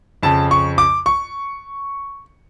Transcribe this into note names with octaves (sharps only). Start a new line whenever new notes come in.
F2 C#3 F3 A5
C#6
D6
C#6